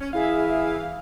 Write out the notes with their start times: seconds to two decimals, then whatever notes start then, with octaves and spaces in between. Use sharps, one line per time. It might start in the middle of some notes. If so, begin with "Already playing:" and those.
0.01 C#4
0.13 E3 E4 G#4 E5 F5